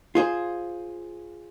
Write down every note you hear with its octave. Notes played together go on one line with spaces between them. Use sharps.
F4 G#4 C5